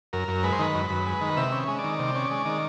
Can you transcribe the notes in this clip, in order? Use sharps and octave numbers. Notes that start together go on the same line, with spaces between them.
F#2 A#4
F#2
G#3 B4
C5
D#3 B4
F#2
F#2
G#3
D#3
C3 E5
C#4
G#3
D5
D#3
C3
C#4
G#3
D#3